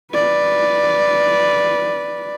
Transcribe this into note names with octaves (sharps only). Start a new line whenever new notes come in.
B4 D5